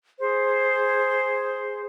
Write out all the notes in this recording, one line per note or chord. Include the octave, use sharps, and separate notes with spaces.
G#4 C5